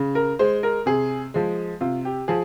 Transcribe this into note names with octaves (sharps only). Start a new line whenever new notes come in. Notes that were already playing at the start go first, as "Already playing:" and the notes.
Already playing: C#3
A#4
G#3 C5
A#4
C3 G#4
F3 G#3
C3 F4
G4
F3 G#4